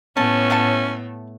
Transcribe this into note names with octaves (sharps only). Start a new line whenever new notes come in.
A2 A3 B3 C#4 A5
F5 F#5 A5